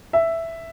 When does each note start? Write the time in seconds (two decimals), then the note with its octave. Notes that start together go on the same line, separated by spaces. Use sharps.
0.13 E5